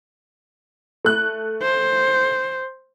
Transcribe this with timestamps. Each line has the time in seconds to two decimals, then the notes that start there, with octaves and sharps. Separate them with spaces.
1.05 A3 F#6
1.62 C5